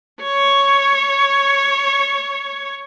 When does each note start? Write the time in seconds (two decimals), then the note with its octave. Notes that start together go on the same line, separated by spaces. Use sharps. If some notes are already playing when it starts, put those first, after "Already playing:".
0.23 C#5 C#6